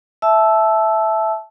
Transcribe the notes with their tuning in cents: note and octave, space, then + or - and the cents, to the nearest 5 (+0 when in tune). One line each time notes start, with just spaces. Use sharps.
E5 +0 A5 -20 E6 +0